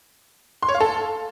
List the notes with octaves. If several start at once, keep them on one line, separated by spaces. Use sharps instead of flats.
C6
C#5
F5
A4